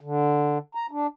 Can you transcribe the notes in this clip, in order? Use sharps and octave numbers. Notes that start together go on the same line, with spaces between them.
D3
A#5
D4